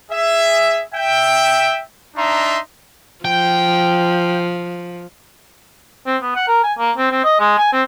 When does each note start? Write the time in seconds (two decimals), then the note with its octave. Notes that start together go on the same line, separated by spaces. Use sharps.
0.11 G#4 E5
0.94 E5 G5
2.16 D4 D#4 E5 A#5 C6
3.25 F3 G5
6.06 C4
6.22 B3
6.35 F#5
6.48 A#4
6.63 G#5
6.78 A#3
6.97 C4
7.11 C4
7.24 D#5
7.40 G#3
7.58 G#5
7.72 C4